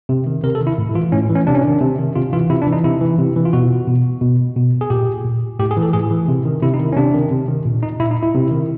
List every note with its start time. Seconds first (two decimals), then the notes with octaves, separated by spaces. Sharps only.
0.09 C3
0.26 D#3
0.44 C3 A#4
0.55 A4
0.61 D#3
0.67 E4
0.78 A2
0.95 E3 F4
1.12 A2 C#4
1.29 E3
1.35 C#4
1.47 C3 D4
1.54 C#4
1.62 D#3 D4
1.81 C3
1.98 D#3
2.16 C3 F4
2.33 E3 F4
2.49 C3 E4
2.62 D4
2.67 E3
2.72 D#4
2.84 C3 E4
3.01 E3
3.18 C3
3.36 E3
3.45 F4
3.53 B2 F#4
3.87 B2
4.21 B2
4.56 B2
4.81 G#4
4.90 A#2 G4
5.25 A#2
5.59 A2 G4
5.71 G#4
5.77 E3
5.82 A4
5.93 A2 G#4
6.11 E3
6.28 C3
6.45 D#3
6.62 C3 E4
6.74 D#4
6.80 D#3
6.92 C#4
6.97 C3 D4
7.14 D#3
7.31 C3
7.48 D#3
7.66 A#2
7.83 D#4
8.00 A#2 E4
8.11 D#4
8.23 E4
8.34 C3
8.51 D#3